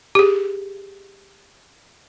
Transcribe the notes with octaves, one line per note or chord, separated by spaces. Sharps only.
G4 G#4